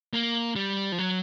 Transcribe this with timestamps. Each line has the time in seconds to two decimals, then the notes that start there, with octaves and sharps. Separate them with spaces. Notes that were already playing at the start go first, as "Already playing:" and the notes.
0.13 A#3
0.56 G3
0.92 F3
0.99 F#3